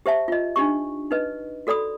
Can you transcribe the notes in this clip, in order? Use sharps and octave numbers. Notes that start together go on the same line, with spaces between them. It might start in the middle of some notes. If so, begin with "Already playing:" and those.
G4 C5 E5 A5
F4 D#5
D4 D#4 G4 C#6
D#4 B4 D#5
F#4 A4 D5 B5 D#6